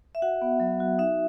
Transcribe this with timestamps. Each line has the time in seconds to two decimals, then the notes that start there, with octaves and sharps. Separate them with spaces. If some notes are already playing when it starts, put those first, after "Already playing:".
0.15 E5
0.22 F#4 F#5
0.42 B3
0.60 F#3
0.80 F#4
0.98 D#4 E5